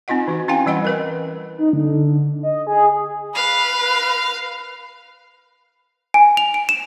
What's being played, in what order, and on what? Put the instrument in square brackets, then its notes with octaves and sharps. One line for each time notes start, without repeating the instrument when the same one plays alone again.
[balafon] C4 D#4 F4 D#5 F#5
E3 F#4
C#4 E4 F5 G5 G#5
E3 G3 D#5 F#5 B5
A#4 B4 D#5
[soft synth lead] D#4
D3
D#5
G#4
[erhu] B4 [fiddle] F5
[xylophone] G#5
F7
D7
E7